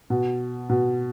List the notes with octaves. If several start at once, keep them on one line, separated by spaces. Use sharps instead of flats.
B2
B2